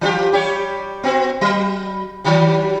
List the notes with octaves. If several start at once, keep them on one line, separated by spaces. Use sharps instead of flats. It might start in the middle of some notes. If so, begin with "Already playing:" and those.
E3 F4 G4
G3 G4 C#5
B3 C4 F#4
F#3
D#3 F#3 G3